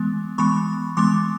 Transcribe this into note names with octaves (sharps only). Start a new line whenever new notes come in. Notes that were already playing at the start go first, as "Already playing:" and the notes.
Already playing: E3 G#3 B3
E3 G#3 B3 B5 C#6
E3 G#3 B3 C6 D6